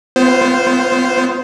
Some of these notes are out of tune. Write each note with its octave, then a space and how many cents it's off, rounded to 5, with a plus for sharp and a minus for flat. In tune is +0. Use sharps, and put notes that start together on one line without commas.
B3 +35 F4 -15 C5 +0